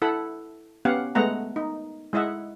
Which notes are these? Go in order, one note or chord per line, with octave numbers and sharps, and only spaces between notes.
E4 A4 F#5 B5
B3 C#4 G4 F5 F#5
G#3 A3 B3 F#5 A#5
D#4
G#3 E4 D#5 E5 F#5